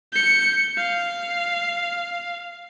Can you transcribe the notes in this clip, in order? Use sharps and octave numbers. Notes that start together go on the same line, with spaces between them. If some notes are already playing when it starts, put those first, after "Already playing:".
G6 C#7
F5